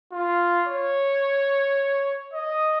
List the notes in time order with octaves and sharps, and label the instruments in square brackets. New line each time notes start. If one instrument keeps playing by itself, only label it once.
[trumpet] F4
C#5
D#5